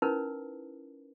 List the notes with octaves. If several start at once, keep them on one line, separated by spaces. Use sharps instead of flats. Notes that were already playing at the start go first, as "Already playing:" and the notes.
C#4 D#4 E4 A#4 B4